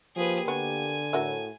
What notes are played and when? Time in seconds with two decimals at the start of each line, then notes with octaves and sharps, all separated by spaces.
0.16 F3 A#3 G4 G#4 B4
0.48 D3 B3 F#4 G#5
1.13 A2 F#4 A#4 E5